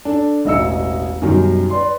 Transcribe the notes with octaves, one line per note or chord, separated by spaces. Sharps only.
D4 A4
E1 A1 D#5 E5 E6 C#7
F#2 B2 D#3 G3
B4 D5 C6